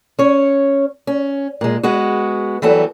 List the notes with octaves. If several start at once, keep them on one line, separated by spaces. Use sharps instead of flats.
C#4 C#5
C#4
A#2 G#3
G#3 B3 F#4
E3 F#3 G3 B3 A4